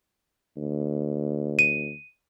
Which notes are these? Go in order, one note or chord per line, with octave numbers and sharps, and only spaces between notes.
D2
D#7